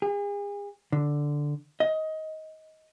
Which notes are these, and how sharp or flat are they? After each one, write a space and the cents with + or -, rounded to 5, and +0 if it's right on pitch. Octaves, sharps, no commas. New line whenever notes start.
G#4 -40
D3 +0
D#5 +20